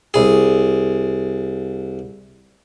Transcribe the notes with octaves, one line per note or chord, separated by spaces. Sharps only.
C2 G#4